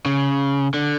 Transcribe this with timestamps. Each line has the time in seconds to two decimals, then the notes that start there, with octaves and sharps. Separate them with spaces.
0.06 C#3
0.74 D3